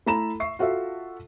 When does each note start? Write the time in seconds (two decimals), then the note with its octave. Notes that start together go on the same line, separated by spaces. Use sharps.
0.06 A3 E4 A4 A#5 B5 E7
0.40 E5 C#6 C7
0.59 F4 F#4 A4 E5